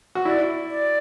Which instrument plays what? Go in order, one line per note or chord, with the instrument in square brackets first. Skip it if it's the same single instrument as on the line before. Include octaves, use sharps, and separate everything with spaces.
[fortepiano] F#4
[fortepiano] E4 [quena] D5
[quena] D5